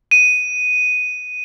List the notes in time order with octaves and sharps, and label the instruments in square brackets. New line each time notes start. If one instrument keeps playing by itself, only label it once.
[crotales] D#7